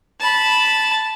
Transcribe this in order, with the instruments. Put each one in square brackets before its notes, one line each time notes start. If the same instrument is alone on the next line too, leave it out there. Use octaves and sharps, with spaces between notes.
[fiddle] A5 B5